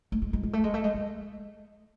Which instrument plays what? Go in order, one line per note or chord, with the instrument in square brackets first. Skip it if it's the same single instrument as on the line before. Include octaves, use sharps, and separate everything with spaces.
[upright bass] A3
G#3
G#3
G#3
A3
G#3
A3
G#3
G#3